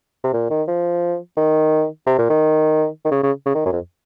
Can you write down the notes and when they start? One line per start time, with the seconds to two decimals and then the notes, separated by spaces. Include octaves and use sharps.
0.24 C3
0.34 A#2
0.50 D#3
0.68 F3
1.37 D#3
2.07 C3
2.18 A#2
2.30 D#3
3.05 D#3
3.11 C#3
3.23 C#3
3.46 C#3
3.55 D#3
3.66 F#2
3.73 F2